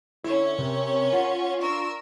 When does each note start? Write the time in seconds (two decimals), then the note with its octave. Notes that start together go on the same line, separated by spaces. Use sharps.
0.24 D3 C#4 E4 C#5
0.58 C3 A#4
1.13 F4 F#5
1.61 D4 A#4 C#6 E6